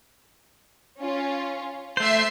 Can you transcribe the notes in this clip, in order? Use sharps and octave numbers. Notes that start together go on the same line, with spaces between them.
C#4 F4
A3 C5 E5 C6 C7